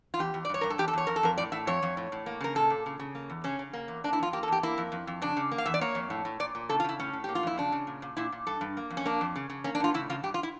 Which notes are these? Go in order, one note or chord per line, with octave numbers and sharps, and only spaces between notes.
F4
E2 G4
E2
D5
G2 C#5
G2 A#4
A4
E2 G4
A4
E2 C#5
F2 A#4
A4
F2 A#4
A2 D5
A2 E5
F2 C#5
F2
A2
A2
A#3
C#3 A#4
A#2 A4
A#2
C#3
C#3
A#3
E2
C#3 C#4
C#3
A#3
E2
A#3 D4
E4
F2 F4
A#3 G4
A4
E2 G4
A#3 E4
F2
F2
F2
C#3 D4
C#3
A#3
F5
E2 E5
D5
A#3 C#5
F2
A2
A2
A#2 D5
A#2
C#3 A4
F4
C#3 E4
A2 C#4
A2
A#3 G4
F4
F2 E4
C#3 D4
C#3
A#2
A#2
A#2 E4
A#2
G2 A4
G2
A#3
F2
C#4
A#3 D4
F2
C#3
C#3
A#3 C#4
D4
A2 F4
C#3 E4
C#3 F4
G2 G4
F4
E4